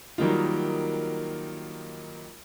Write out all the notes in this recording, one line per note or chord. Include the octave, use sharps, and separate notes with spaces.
D#3 F#3 G3 A#3 D#4 F4